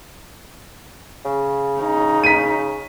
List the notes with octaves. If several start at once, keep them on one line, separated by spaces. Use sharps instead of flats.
C#3
C#3 D#4
B6 D#7